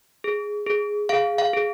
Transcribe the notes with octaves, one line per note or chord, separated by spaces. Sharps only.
G#4
G#4
G#4 F5
F5
G#4